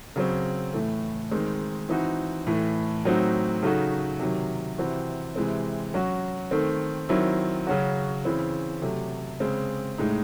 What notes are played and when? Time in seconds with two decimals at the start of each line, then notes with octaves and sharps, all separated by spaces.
0.16 C#3 F#3 C4
0.73 A2 E3 A3
1.31 D#3 G#3 C4 D#4
1.89 E3 C4 D#4 F#4
2.47 A2 E3 A3
3.05 A2 F#3 C4 D#4 F#4
3.62 C#3 F#3 A3 D#4 F#4
4.20 C3 D#3 F#3
4.78 C3 E3 C4 F#4
5.36 C3 E3 G#3 C4
5.94 F#3 C#4 F#4
6.51 D#3 A3 C4
7.09 D#3 F#3 C4 E4
7.67 C#3 F#3 C#4 F#4
8.25 C#3 E3 C4 E4
8.82 C3 F#3 A3
9.40 C#3 G#3 C4
9.98 A2 G#3 D#4